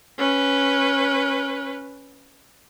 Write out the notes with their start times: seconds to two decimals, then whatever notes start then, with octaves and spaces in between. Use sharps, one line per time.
0.18 C#4 B4